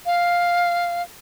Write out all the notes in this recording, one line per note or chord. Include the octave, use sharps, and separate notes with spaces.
F5